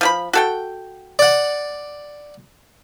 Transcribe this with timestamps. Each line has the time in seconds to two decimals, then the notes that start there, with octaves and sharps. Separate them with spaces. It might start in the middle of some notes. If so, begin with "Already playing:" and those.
0.01 F3 G4 B5
0.33 F#4 A4 G5
1.19 D5 F#5